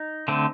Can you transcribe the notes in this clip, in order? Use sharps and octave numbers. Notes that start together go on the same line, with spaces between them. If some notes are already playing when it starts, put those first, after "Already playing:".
Already playing: D#4
D3 A3 C4